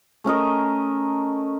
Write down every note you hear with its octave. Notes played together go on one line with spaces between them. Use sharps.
A3 C#4 A#4 D#5